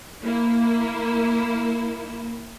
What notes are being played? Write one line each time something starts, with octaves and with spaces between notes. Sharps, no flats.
A#3 E4